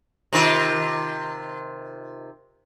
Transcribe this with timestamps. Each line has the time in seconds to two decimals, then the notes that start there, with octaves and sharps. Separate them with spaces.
0.33 C3 D#3 F4